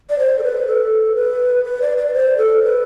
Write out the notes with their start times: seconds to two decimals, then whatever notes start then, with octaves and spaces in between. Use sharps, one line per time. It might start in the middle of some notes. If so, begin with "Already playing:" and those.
0.10 D5
0.19 C5
0.39 A4
0.43 B4
0.67 A4
1.16 B4
1.65 B4
1.82 D5
1.98 D5
2.14 C5
2.38 A4
2.63 B4